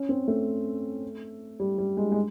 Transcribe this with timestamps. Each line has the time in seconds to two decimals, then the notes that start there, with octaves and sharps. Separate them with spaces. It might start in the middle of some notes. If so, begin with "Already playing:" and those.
Already playing: C#4
0.09 C4
0.28 A3
1.60 G3
1.78 G3
1.97 G#3
2.12 G#3